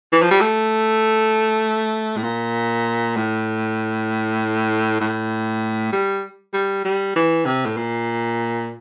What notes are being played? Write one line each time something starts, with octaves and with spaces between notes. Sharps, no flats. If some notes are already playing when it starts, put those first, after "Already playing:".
E3
F3
G3
A3
A2
A#2
A2
A2
G3
G3
G3
E3
C3
A2
A#2